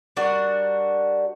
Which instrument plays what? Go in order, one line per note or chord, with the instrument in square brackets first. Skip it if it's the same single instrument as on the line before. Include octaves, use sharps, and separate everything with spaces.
[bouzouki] G3 D4 F#4 A#4